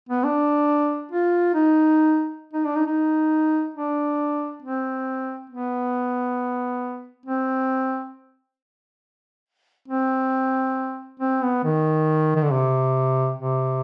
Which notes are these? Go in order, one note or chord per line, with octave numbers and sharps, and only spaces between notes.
B3
D4
F4
D#4
D#4
D4
D#4
D#4
D4
C4
B3
C4
C4
C4
B3
D#3
D#3
D3
C3
C3